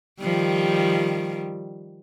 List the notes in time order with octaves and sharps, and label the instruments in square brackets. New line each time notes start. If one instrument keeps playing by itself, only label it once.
[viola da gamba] D#3 F3 G3